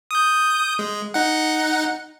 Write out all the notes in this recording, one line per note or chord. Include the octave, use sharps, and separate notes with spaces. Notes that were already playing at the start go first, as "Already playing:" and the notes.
D#6 G6
G#3
D#4 F#5